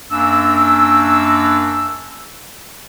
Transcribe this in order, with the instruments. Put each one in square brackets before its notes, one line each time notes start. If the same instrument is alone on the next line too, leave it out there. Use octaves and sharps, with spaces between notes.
[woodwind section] F#2 A#3 D4 E6